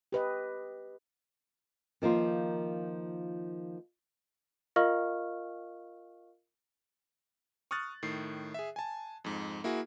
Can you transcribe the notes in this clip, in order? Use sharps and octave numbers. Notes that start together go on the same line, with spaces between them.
G4 B4 D#5
D#3 F3 A#3 F4
F4 A#4 D#5 F5 C#6 F6
C#6 D#6 F6 F#6 A6
A2 D#3 C7
G#4 E5
G#5 A5
F2 G#2
A#3 E4 F#4 G#4